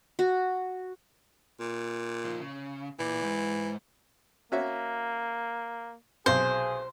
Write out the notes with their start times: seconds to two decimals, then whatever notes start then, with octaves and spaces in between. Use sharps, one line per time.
0.19 F#4
1.60 A#2
2.25 F3 D#4
2.40 C#3
2.99 A#2 E3
3.23 G#2
4.52 A#3 C#4 F#4 E5
6.26 B1 C3 G#4 C5